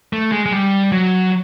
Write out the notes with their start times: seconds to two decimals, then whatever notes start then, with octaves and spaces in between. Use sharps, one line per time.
0.13 A3
0.32 G#3
0.46 G#3
0.52 G3
0.92 F#3